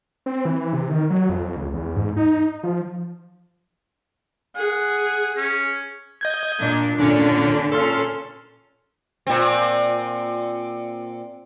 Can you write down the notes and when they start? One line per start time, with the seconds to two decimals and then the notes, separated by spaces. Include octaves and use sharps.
0.26 C4
0.45 E3
0.73 C3
0.89 D#3
1.10 F#3
1.29 F2
1.43 F2
1.56 C#2
1.74 E2
1.96 G#2
2.17 D#4
2.63 F3
4.56 G#4 F#5
5.37 C#4
6.21 D#5 G6 G#6
6.59 A#2 D4
7.00 A#2 D3 C#4 D4
7.72 A#2 C#4 A4 C6 F6
9.27 A#2 C4